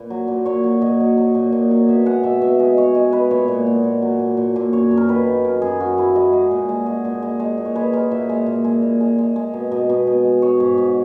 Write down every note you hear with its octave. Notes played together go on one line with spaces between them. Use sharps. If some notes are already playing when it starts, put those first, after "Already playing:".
Already playing: A#2 B4
F#3
A#2
A#2 C#5
F#3
A#2 D#5
F#3
F#3
A#2
A#2
F#3
B2 E5
G#3 F#5
B2 E5
B2 E5
G#3 D#5
G#3 C#5
G#3 D#5
G#3 B4
A#2 C#5
A#2
A#2
A#2
F#3
A#2
A#2
A#2
F#2 C#5
F#2
A#4
D#3 B4
D#3
F#2 A#4
F#2 G#4
F#2 F#4
F#2 E4
G#3 D#5
G#3
A#2
G#3
G#3
A#2
G#3
G#3
A#2
C#5
G#3 B4
G#3 A#4
A#2 E5
G#3
A#2
G#3
A#2
G#3
G#3
G#3
B2
B2 D#5
B2
B2
G#3
G#3 C#5
G#2
G#2